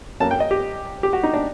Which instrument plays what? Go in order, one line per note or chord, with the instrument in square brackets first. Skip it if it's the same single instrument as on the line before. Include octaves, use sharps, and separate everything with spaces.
[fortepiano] F#2 F#3 A#3 A5
G5
D#5
G4
G4
F#4
D#4
D4